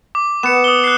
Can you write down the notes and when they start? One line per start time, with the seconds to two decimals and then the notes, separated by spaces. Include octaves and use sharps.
0.15 D6
0.43 B3 C#7 E7
0.64 D#6 G7
0.84 F#6 C7